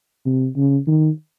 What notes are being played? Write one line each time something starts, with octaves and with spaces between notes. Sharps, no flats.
C3
C#3
D#3